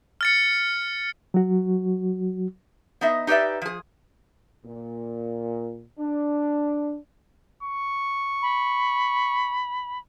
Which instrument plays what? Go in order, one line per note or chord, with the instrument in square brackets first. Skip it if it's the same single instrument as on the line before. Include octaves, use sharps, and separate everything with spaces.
[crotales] F6 A6 C#7
[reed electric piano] F#3 F#4
[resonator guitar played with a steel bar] B3 D#4 D#5 E5
D#4 G4 B4 D5 E5
F3 G#4
[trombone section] A#2
D4
[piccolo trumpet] C#6
[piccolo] B5